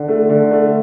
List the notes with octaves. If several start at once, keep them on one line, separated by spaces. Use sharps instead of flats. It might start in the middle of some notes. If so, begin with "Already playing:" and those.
Already playing: D3
A3
D3
A3